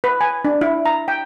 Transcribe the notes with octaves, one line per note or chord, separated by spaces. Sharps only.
B4
G#5
D4
E4
A#5
G5